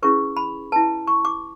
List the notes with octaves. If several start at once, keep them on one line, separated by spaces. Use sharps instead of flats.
C#4 E4 G#4 B4 C#6
B5
E4 B4 A5
C#6
D6